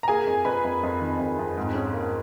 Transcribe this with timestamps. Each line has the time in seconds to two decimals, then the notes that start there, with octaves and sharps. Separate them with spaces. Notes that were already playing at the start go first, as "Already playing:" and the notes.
0.03 A#5
0.08 A#3 G#4 G#5
0.27 F2
0.45 F2 B4 B5
0.65 F2
0.83 F2
1.01 D#3
1.19 F2
1.39 F2
1.57 G#2
1.75 C#4
1.94 A#3